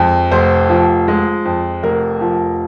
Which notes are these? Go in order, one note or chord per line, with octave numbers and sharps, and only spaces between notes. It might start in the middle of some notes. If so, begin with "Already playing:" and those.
Already playing: F2 G#3
F1 C5
F3
G#3
F2
F1 A#4
F3